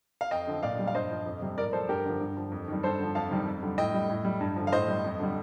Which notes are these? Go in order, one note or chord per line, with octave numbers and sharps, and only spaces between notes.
F5
F2 D#5 G5
D3 F3
A#2 D5 F5
G3
F5
G2 C5 D#5
F3
F2
C3 G3
A2 A#4 D5
F3 A4 C5
G2 G4 A#4
D3 F3
G2
F3
F2
D#3 G3
G2 A4 C5
D3 F3
F2 F5 A5
C3 D#3 G3
F2
D3 G3
A2 D#5 G5
G3
A2
G3
G2
D3 F3
F5
A2 C5 D#5
G3
F2
D3 G3